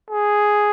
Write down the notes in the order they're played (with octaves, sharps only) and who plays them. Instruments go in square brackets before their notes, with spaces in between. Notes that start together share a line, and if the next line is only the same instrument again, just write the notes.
[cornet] G#4